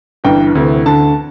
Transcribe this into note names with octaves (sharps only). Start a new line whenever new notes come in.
G1 G2 E3 G5
D2 C3 E3
D2 D3 A5